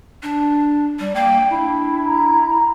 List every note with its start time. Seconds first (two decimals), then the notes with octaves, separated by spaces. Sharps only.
0.23 D4
0.99 G3
1.15 A#3 G5
1.50 D4 E4
2.06 A#5